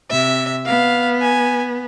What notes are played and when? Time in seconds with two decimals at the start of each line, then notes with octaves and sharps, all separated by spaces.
0.10 C3 E5
0.66 B3 F5
1.22 G#5